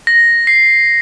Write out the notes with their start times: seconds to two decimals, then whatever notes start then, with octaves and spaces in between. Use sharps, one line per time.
0.07 A#6
0.47 C7